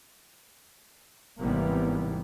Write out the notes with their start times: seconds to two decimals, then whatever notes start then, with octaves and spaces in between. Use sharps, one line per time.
1.40 G#1 C3 E3 G3 A#3 B3